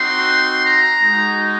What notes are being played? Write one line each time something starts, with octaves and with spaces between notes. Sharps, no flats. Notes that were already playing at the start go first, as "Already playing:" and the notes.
Already playing: C4 D#4 F#4 C6
A#5
G#3 D#4 F#4